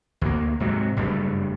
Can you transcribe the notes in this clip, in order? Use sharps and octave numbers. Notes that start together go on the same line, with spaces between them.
D2 A#3
G#2 C3 F#3
F#1 G2 G3 A3